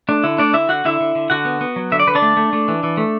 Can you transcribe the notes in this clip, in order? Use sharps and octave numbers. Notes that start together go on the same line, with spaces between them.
A3 D4
D3 E4
A3 D4 D5
D3 E4 E5
D3 F#4 F#5
D3 E4 E5
D3
D3
D3 F#4 F#5
B3
B3
F#3
D3 E5
D5
D3 B4
D4 D5
A3
A3
A3
E3
E3
A3